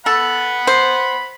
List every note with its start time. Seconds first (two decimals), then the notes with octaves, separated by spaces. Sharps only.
0.06 A4 F#5 B5
0.67 C5